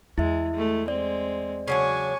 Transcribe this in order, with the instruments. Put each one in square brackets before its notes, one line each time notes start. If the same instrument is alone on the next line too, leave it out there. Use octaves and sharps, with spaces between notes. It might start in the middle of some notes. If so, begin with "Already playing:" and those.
[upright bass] E2 [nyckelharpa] G#3 [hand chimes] E4 E5
[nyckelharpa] G#3 A3
[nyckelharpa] G#3 C4 [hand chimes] D5
[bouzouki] C#3 F#3 D4 [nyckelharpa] G#5 C#6